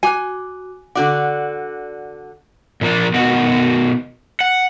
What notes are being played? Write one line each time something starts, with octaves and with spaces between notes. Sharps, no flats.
F#4 G#5 D6 F#6
D3 F#4 D5 F#5
A#2 F3 A#3 D4
B2 D#3 F#4
F#5